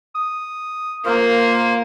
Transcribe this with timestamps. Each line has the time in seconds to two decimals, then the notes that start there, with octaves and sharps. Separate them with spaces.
0.15 D#6
1.06 A#3 F4 A#4 C5